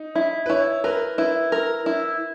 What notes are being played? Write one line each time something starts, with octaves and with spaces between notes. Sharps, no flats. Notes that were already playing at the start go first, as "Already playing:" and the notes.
Already playing: D#4
E4
B4
E4 C#5
A#4 B4
E4 B4
A#4
E4